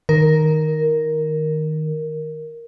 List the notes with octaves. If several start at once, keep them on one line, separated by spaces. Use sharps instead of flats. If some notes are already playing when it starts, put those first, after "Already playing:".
D#3 A#4